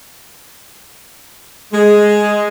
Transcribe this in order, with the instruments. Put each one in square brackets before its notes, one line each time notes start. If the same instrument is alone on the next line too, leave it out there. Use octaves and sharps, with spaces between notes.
[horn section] G#3